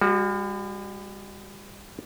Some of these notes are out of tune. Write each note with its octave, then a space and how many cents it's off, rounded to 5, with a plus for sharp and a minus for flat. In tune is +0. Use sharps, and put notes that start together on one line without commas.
G3 +45 F#4 +0